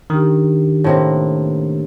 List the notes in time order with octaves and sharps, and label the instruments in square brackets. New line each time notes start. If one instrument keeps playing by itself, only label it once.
[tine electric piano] D#3 [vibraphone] D4 G4
[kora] A2 C3 A#3